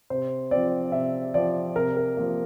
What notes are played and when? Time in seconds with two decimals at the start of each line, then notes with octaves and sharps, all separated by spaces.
0.10 C3 C5
0.51 F3 C4 D5
0.92 C3 E5
1.34 F3 C4 D5
1.76 C3 A#4
1.97 A#4
2.17 F3 A#3